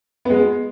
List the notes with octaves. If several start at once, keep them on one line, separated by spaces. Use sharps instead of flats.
G#3 B3